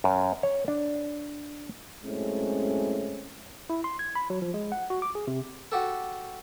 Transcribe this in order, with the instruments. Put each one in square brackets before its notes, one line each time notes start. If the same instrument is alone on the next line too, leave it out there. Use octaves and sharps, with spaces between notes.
[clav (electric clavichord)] F#2
C#5
D4
[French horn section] F#2 A2 G#3 C4 C#4
[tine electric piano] E4
C6
G#6
B5
F#3
F3
G#3
F#5
F#4
D6
G#4
C3
[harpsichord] F#4 G4 A4